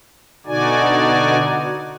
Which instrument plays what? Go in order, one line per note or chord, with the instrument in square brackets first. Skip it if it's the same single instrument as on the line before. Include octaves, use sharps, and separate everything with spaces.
[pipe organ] B2 D3 D#4 F#4 D5 G#5